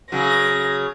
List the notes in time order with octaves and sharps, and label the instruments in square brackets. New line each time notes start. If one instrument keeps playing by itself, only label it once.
[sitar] C#3 F#3 [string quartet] A#6